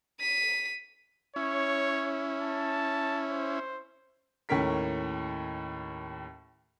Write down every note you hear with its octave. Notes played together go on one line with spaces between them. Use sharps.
B6 D#7
C#4 E4 C#5
A5
C5
D#2 A2 C#4 A#4 B6